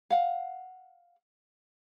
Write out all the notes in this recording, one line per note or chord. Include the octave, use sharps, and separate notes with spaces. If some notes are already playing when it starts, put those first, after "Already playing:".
F5 F#5